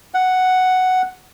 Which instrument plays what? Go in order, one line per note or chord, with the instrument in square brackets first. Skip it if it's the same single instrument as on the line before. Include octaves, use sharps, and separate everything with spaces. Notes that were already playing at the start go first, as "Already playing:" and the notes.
[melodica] F#5